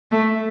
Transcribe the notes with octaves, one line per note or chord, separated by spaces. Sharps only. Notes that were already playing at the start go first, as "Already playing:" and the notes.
A3